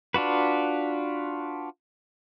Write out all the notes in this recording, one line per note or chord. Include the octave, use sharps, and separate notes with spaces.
D4 F4 F#4 B4